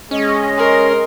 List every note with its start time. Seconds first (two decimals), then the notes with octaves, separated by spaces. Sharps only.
0.11 G#3 C#4 D#5
0.57 A#4 C6